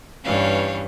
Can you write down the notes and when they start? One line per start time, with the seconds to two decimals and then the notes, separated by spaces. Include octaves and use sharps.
0.24 G2 E3 C#4 C#5 F5